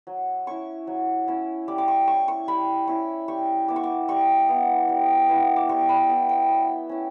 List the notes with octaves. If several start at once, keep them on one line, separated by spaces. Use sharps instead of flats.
F#3
C#4 E4 C#6
F#3
C#4 E4
G3 D6
D6
C#6
C#4 E4 C#6
C#6
G3 B5
C#4 E4 C#6
G3 C#6
B3 E4 D6
C#6
D6
G3 C#6
B3 E4
G3
B3 E4
D6
G3 C#6
B5
B3 E4 A5
G5
F#3
C#4 E4